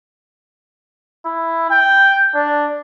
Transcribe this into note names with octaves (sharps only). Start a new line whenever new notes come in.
E4
G5
D4